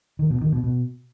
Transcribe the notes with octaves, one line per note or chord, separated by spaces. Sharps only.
D#3
B2
D#3
B2
B2